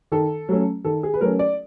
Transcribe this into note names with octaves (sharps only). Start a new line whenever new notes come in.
D#3 A4
F#3 A3 C#4
D#3 A4
G#4
B4
F#3 A3 C#4 A#4
D5